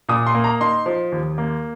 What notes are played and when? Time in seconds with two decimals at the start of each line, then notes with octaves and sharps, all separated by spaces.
0.09 A#2 D#6
0.26 C6
0.35 A#3
0.44 A#5
0.61 D#4 C6
0.86 F3
1.12 D#2
1.38 A#3